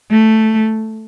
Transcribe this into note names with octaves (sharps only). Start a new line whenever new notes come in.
A3